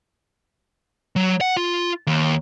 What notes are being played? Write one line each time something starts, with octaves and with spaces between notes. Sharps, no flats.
F#3
F#5
F4
D#2